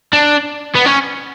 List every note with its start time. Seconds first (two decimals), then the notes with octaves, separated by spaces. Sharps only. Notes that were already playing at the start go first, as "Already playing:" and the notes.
0.13 D4
0.76 B3
0.86 C#4